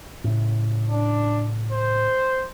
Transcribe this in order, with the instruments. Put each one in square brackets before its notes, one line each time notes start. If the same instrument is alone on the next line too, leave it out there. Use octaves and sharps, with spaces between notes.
[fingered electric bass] A2 C#3
[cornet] D4
C5